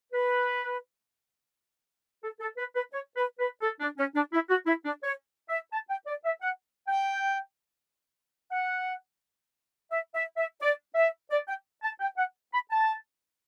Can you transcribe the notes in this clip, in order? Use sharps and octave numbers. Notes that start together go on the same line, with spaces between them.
B4
A4
A4
B4
B4
C#5
B4
B4
A4
D4
C#4
D4
E4
F#4
E4
D4
C#5
E5
A5
G5
D5
E5
F#5
G5
F#5
E5
E5
E5
D5
E5
D5
G5
A5
G5
F#5
B5
A5